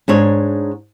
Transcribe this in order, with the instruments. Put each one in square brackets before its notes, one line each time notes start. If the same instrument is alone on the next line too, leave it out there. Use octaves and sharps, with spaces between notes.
[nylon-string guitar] G#2 D4 C#5